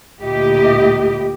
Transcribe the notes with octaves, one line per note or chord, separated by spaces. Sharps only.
D2 A#2 E4 G4 D#5